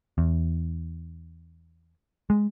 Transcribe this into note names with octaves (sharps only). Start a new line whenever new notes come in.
E2
G#3